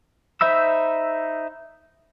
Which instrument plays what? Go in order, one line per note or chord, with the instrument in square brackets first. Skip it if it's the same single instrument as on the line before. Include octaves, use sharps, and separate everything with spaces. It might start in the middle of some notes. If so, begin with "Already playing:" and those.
[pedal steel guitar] D#4 C5 E5 B5 E6